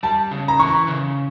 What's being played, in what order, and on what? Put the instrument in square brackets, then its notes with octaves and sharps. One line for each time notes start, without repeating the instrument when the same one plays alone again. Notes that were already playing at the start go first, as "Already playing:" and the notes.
[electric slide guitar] G3 [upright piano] A5
[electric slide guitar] C#3
[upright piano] A#5
[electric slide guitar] E3 [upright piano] C#6
[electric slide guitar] C#3